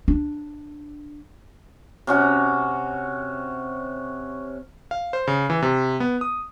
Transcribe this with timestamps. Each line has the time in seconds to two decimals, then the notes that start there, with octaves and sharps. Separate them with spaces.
0.08 D4
2.07 C3 C#4 F#4
4.91 F5
5.13 C5
5.27 C#3
5.50 E3
5.62 C3
6.00 B3
6.21 D#6